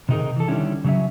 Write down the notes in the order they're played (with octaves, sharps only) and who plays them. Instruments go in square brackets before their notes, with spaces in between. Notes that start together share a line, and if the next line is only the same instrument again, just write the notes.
[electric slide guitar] C3 D#3 D#4 F#4 G#4 A#4
E3 A4
D3 D#3 G3 C#4 E4
C#3 F#3 C#4 E5